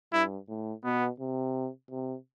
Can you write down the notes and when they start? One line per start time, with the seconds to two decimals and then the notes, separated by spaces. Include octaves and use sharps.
0.12 G2 E4
0.48 A2
0.84 B2 B3
1.20 C3
1.91 C3